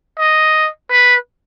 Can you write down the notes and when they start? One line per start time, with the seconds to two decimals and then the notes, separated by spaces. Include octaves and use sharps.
0.18 D#5
0.90 B4